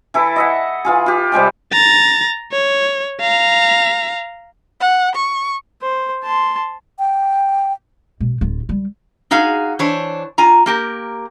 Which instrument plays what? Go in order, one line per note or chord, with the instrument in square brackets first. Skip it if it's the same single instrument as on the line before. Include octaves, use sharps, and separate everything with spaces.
[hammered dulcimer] E3 E4 A4
D#5 E5 F#5
E3 F4 G#4
F4 G4
C3 G3 G#3 G5
[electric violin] A#5 A6
C#5
F5 A#5
[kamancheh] F#5
C#6
[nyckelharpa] C5
A5 C6
[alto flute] G5
[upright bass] B2
D1 F4
G3
[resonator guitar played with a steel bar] D#4 F#4 G#4 F5
E3 D4 C5 C#5
F4 G#5 A#5
A#3 G4 A#4